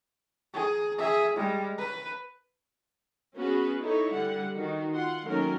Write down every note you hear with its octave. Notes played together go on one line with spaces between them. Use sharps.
G#4
G#4 E5
G3 G#3
B4
B3 C#4 F#4 G#4 B4
D#4 E4 A4 C#5
D3 G3 F#5
D#3 D#4 F#4
F4 F#5 C6
D#3 F#3 A3 A#3 C#4 A#4